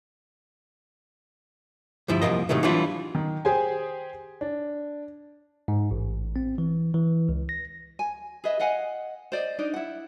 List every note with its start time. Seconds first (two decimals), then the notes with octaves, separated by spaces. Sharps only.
2.08 D2 G2 F3 E4
2.22 C2 F#2 A#2 F3 A#3 D#5
2.49 A2 C3 D#3 F#3 A3
2.63 E3 F#3 G3 D4 E4 F4
3.15 D#3
3.45 G4 G#4 C5 G#5
4.41 D4
5.68 G#2
5.91 A1
6.36 C4
6.58 E3
6.94 E3
7.29 C#2
7.49 A#6
7.99 G#5
8.44 G#4 B4 D#5 E5
8.59 D#5 F5 F#5 G#5
9.32 C5 D5 D#5
9.59 D4 D#4 D5 D#5
9.74 E4 F#5